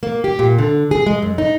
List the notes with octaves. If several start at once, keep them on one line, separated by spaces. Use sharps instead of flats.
A#3
G4
A#2
D3
G#4
G#3
F#2
D#4